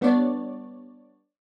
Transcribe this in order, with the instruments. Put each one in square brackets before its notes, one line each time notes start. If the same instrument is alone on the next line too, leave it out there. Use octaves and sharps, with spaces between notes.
[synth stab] G3 B3 D4 C#5 D5